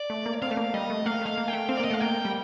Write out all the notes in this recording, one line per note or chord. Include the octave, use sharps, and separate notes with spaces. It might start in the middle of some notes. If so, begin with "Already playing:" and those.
Already playing: D5
A3
A#3
C4 F5
A3
A#3
G3 D#5
A3
A#3 F5
A3
F5
A#3
A3 G5
C4 F5
D5
A#3 D#5
A3 F5
A#3 G5
G3